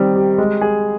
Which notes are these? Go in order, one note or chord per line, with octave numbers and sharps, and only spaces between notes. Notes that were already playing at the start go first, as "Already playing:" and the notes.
Already playing: D#3 G3 C4
G4
G#3
G#4